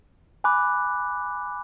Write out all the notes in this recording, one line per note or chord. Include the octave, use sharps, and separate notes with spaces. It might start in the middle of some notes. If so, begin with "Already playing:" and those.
G#5 B5 D6 F#6